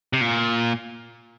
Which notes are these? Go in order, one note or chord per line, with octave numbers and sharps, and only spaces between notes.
C3
A#2